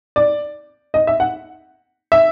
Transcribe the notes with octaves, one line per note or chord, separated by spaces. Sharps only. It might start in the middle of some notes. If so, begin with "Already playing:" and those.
D5
D#5
E5
F#5
E5